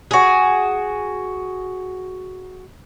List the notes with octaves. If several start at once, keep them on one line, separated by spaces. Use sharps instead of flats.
F#4 G#4